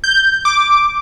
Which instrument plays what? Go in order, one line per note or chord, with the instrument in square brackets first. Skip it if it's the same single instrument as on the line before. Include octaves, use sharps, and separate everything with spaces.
[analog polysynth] G6
D6